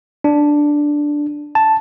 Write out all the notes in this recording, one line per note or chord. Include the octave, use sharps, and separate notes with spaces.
D4
A5